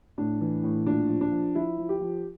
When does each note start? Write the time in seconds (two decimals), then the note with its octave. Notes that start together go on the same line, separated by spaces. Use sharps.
0.18 A2 D4
0.41 E3
0.63 A2
0.86 A#2 D4
1.09 F3
1.21 D4
1.32 F3
1.54 F3 E4
1.78 F3
1.89 G4
2.00 F3